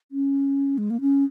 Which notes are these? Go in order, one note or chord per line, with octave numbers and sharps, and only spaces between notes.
C#4
G#3
A#3
C#4